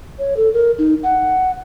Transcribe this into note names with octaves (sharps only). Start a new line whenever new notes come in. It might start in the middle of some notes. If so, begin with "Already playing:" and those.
C#5
A4
A#4
D#4
F#5